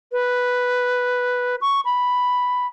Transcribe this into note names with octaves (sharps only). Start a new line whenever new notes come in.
B4
C#6
B5